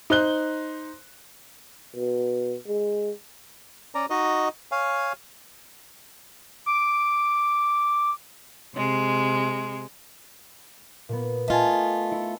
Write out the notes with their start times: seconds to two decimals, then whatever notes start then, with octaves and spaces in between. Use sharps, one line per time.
0.10 D#4 C5 F#6 G7
1.96 B2
2.67 G#3
3.95 C#4 D5 A#5
4.10 D#4 F#4 D#5
4.72 C#5 F5 G#5
6.66 D6
8.75 C3 G#3
11.09 A#2 B3
11.48 A3 F4 D#5 G#5 A5
12.11 E4 C#7